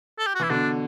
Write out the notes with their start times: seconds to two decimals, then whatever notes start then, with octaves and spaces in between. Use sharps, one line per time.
0.19 A4
0.26 G4
0.35 F#4
0.40 E3 E4
0.50 B2 D3 D4